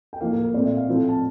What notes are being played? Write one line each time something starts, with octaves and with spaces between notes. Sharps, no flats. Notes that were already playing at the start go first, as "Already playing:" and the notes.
G5
A2 F3 A#3 F5
A#4
A#4
A#2 A3 C4 D5
E5
F5
A2 F3 A3 C4
A5